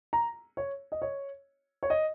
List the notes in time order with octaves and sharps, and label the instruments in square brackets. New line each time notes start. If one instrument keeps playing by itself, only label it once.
[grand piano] A#5
C#5
D#5
C#5
C#5
D#5